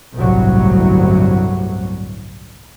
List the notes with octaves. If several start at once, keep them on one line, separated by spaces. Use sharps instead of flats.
G1 C2 A2 F#3